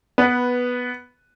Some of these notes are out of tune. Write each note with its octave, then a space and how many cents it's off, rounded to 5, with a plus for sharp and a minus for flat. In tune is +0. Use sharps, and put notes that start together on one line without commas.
B3 +0 B4 -5